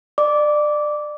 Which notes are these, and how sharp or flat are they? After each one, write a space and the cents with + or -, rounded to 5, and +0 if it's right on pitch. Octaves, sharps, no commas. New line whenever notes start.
D5 +25 D6 -15